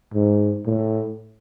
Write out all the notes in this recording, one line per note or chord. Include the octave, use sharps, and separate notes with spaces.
G#2
A2